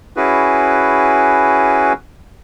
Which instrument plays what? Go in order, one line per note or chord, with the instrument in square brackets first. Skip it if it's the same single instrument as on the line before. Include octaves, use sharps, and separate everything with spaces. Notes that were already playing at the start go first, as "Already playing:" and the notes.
[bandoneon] C#4 E4 F#4 G#4 B4